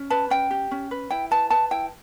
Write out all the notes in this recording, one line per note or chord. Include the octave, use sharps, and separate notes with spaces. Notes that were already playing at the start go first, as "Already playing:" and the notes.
Already playing: C#4
B4 A5
C#4 G5
G4
C#4
B4
E4 G5
B4 A5
B4 A5
E4 G5